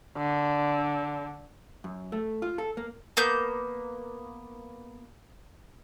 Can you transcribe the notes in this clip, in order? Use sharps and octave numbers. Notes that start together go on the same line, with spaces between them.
D3
F#2
A3
F4
A4
A#3
A#3 B3 G6